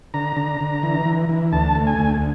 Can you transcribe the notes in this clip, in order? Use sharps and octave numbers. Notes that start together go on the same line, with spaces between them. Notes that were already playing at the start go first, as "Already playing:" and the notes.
D3 A#5
D3
D3
E3
E3
E3
D2 A5
A3
G#5
D2